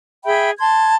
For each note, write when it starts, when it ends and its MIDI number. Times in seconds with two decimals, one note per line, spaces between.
0.24 0.51 68
0.24 0.51 76
0.24 0.51 79
0.24 0.51 83
0.59 0.95 81
0.59 0.95 84
0.59 0.95 92